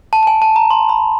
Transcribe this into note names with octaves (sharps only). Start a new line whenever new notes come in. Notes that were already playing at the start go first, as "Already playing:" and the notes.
A5
A5
G#5
A5
A#5
C6
B5